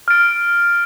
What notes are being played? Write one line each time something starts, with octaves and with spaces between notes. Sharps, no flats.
F6 A6 D7